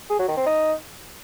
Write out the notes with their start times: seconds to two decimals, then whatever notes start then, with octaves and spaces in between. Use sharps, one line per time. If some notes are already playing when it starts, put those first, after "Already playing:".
0.10 G#4
0.19 F#3
0.28 D#3
0.37 C4
0.46 D#4